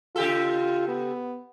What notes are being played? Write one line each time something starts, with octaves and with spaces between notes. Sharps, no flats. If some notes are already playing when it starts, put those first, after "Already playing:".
C#3 F4 G4 A4
B3